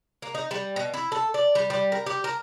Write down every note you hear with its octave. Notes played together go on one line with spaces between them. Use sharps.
A#3
D#4
G3
B2
E4
A4
D5
G3
G3
A#4
G4
A#4